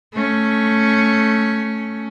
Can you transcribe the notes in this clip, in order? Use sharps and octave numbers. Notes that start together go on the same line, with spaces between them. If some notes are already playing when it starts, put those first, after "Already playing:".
A3 C#4